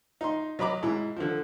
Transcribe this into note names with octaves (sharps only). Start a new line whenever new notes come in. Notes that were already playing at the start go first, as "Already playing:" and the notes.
D#4 C6
F#3 D#5 B5 D6
G#2 E4
D3 F3